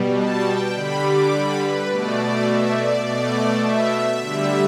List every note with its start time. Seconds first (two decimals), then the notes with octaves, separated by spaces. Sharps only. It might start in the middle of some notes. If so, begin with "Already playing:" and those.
Already playing: B2 G3
0.17 A5
0.46 G5
0.74 D3 G3 B5
1.03 D6
1.31 B5
1.60 B4
1.89 B2 A3 D5
2.17 D5
2.46 E5
2.75 D5
3.03 B2 A3 D5
3.61 E5
4.18 D3 G3